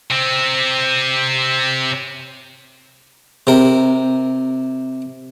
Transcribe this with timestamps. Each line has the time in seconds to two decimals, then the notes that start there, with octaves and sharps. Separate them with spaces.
0.11 C3 C4
3.47 C3 A#4